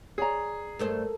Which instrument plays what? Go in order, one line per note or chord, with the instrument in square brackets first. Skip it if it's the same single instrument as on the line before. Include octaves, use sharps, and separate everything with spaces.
[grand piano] G#4 [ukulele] C#5 D5 A#5
[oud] G2 A3 C5 [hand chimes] A4 A#4 A5